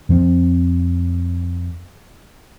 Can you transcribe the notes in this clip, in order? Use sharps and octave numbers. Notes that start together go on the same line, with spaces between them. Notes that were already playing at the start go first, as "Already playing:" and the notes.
F2 F3 C4